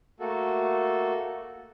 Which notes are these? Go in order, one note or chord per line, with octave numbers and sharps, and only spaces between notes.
A3 A#3 F#4 A4